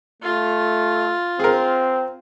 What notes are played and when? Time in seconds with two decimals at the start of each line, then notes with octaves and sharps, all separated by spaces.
0.23 A3 F4
1.40 C4 G#4 A#4